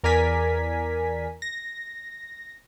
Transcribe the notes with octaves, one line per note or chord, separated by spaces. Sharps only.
E2 A#4 D5 G#5 B6
A#6